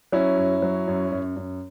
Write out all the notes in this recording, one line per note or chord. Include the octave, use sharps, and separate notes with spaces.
F#3 C#4 E4
F#2
F#3
F#2
F#2
F#2